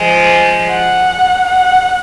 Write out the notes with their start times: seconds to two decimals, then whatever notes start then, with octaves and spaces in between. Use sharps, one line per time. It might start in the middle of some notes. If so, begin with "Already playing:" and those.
Already playing: F3 G#3
0.70 F#5
1.47 F#5